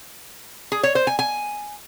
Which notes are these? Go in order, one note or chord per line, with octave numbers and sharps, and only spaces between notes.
G#4
C#5
C5
G#5
G#5